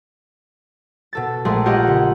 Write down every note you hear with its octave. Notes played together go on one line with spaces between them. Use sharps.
B2 A4 A6
A#1 A#2 G#3 A3 G#4 C6
F4 G4 C#5 D#5 F#5
C#3